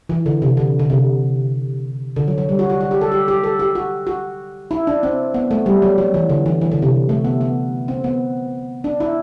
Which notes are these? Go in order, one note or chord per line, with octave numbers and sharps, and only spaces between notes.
E3
D3
C3
D3
D3
C3
D3
F#3
F#3
G3
F#4
F#4
F#4
G4
A4
G4
G4
A4
G4
F#4
F#4
E4
D4
C4
B3
A3
G3
F#3
F#3
E3
D3
E3
E3
D3
C3
A3
B3
B3
C4
B3
D4
E4